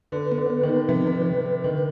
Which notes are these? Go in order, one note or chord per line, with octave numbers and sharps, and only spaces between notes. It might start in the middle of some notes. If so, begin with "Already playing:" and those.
D3 B4
B3
D3
B4
D#3
D#4
C3 F3
B4
B4
B4
D3 D#3